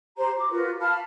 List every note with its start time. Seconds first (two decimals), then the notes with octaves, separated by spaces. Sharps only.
0.16 G4 C5 A#5
0.36 F#4 D6
0.50 F4 F#4 A#4 B4
0.79 F5 A5 B5 F6